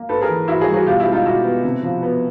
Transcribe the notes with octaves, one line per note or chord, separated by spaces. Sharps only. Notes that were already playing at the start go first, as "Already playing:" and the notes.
Already playing: A#3
G#2 A4 B4
G#4 A#4
E3
G#2 E4 F#4
F#4 G#4
G3
F#4 G#4
B2 F4 G4
E4 F#4
G#3
D#4 F4
B2 E4 F#4
B3
C3
F3
B3